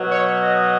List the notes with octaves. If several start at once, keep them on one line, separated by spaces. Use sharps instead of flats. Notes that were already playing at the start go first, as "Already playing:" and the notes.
Already playing: B2 F#3
C#5
D#5